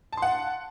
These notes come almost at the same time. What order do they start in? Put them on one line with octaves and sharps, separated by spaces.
A5 C6 F#5